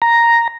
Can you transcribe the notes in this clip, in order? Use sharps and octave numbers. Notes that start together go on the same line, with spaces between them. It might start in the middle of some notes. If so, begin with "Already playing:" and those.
A#5